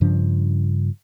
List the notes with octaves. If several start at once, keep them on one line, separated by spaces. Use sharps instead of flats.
G2 C#3 F3 D4